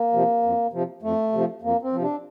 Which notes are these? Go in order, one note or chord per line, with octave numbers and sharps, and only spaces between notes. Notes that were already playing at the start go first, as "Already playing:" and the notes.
Already playing: A#3
C3 F3
F2
C3 F3
F2 A3
C3 F3
F2 A#3
C4
C3 F3
D4